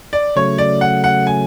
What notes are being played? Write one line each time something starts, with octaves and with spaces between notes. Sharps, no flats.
D5
C#3 F#3 A3 C#5
D5
F#5
F#5
G#5